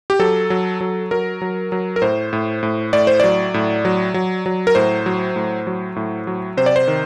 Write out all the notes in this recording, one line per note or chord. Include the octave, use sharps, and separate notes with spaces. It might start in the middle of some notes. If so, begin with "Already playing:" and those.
G4
F#3 A4
F#3
F#3
F#3 A#4
F#3
F#3
A#4
A2 C5
A2
A2
A2 D5
C5
F#3 D5
A2
F#3
F#3
F#3
A#4
A2 C5
F#3
A2
F#3
A2
F#3
C3 C5
D5
C5
D#3